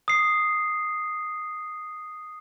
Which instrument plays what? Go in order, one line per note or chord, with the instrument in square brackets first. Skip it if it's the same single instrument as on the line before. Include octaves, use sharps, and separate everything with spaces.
[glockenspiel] D#6 C7